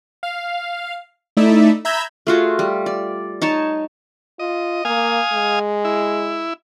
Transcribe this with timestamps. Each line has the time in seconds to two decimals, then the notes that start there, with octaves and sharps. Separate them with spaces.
0.23 F5
1.37 A3 D#4 E4 D5 E5
1.85 E5 A#5 B5 E6 G6 G#6
2.27 A3 F4 F#4 G#4
2.59 G3
2.86 D5
3.42 D#4 C#5 A5
4.39 F4 D#5
4.85 A#3 F5 G#5 D#6
5.32 G#3
5.85 E4